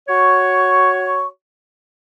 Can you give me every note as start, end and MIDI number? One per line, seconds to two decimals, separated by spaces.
0.08 1.27 66
0.08 1.27 73
0.08 1.27 85